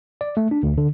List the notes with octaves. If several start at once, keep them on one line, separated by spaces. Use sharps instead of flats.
D5
A3
D4
D2
D3